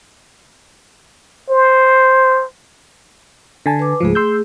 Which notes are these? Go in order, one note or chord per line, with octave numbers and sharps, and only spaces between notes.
C5
D3 G#5 A5
B4 D6
C#2 G#2 F3 A3 G#4
C6 E6 G6